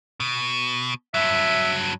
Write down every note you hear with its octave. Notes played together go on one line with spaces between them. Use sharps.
B2
G2 F#3 E5